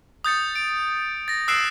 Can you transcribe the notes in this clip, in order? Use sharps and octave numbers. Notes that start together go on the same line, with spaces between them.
D#6 G6 A6 C#7
D7
A6 A#6
D#6 E6 F#6 C7 D7 E7